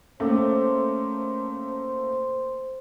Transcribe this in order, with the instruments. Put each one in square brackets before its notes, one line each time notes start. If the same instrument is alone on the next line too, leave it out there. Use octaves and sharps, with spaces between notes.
[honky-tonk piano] A3 A#3 [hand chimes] C#4 D6 [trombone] C5